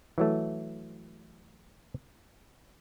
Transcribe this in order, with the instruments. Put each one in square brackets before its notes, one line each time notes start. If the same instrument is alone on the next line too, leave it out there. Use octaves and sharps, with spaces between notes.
[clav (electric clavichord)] E3 F#3 A3